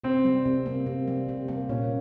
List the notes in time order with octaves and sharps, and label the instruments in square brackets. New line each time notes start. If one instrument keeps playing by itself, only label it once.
[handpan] C3 [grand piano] C4
[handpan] G3
C3
A#3
C3
G3
C3
A#3
[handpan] A#2 [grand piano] C#4